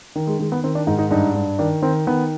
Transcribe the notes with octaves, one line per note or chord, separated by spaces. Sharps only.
D#3
G#3
D#3 G#3
B3
D#3 C4
D4
G#2 D#4
D#4
G2 D#4
G2
D#3 D4
D#3 C4
D#3 B3